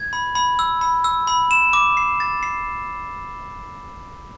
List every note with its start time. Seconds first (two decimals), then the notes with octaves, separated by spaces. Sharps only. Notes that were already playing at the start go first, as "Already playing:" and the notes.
Already playing: G#6
0.13 B5
0.35 B5
0.59 E6
0.81 B5
1.04 E6
1.27 B5
1.51 E7
1.73 D6
1.97 C7
2.20 A6
2.43 C7